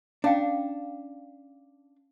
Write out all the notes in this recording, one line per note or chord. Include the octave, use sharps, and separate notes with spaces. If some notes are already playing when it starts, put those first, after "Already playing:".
C#4 D4 F5 G5